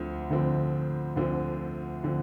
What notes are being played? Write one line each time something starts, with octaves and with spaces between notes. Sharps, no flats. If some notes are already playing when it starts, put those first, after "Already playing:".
Already playing: D2 D3 F3 C4
D2 D3 F3 C4
D2 D3 F3 C4
D3 F3 C4